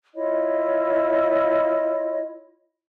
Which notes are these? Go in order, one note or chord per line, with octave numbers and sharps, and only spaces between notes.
E4 F4 C#5 D#5